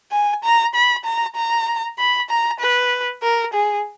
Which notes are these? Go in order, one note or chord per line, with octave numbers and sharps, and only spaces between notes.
G#5
A#5
B5
A#5
A#5
B5
A#5
B4
A#4
G#4